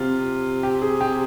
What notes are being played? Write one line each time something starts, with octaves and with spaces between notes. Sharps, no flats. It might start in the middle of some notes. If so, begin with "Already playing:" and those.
Already playing: C3 F4
G4
G#4
G4